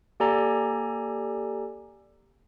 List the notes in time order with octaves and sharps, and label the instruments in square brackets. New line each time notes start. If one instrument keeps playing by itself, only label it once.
[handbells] A#3 G4 A4 D5 G#5 A#5